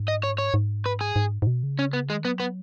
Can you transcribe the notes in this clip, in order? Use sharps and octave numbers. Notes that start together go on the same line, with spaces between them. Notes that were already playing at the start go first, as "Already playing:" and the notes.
Already playing: G#2
D#5
C#5
C#5
G#2
B4
G#4
G#2
G#2
B2
C#3
C#4
B3
D#3 G#3
F#3 B3
B3